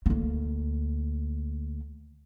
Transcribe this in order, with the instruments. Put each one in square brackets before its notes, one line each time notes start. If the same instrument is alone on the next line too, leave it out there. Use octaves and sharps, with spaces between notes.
[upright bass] D2 A#3